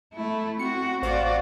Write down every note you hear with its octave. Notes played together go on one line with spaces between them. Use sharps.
A3 E4
C4 F#4 C#7
A1 F#4 C5 D5 F5